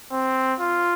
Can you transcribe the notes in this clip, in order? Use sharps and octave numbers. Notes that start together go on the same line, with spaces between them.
C4
F4